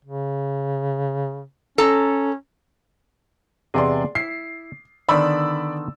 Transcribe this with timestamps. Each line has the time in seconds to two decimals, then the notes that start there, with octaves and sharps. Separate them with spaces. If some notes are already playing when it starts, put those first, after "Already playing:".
0.05 C#3
1.78 C#4 A4 A#5
3.74 E2 C3 G#4 D5 D#5 C6
4.15 E4 C7
5.09 D3 D#3 B3 D5 B5 E6